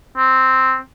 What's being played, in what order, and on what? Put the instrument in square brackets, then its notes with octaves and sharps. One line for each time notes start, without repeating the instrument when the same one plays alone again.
[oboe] C4